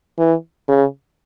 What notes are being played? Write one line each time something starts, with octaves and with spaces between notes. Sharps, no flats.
E3
C#3